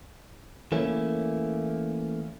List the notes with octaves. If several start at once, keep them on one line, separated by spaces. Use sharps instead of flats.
E3 A3 A#3 C#4